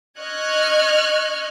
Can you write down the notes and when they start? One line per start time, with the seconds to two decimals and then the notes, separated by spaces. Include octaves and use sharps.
0.20 D#5 C#6 F6 F#6 G#6